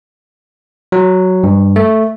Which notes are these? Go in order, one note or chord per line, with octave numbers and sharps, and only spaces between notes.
F#3
G2
A3